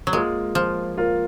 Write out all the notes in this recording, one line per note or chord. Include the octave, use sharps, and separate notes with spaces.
F#3
G#3 A#3 F4 A#4
F3
A#3 F4 A#4